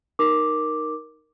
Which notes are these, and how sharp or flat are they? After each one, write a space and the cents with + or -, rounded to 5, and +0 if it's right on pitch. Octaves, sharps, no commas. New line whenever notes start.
D#4 +0 A#4 +0 D6 +0